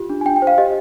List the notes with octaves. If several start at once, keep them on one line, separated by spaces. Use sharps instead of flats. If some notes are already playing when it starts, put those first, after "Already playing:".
Already playing: F4 G4
D4
G#5
D4 G5
G5
C5
F5
G4 D#5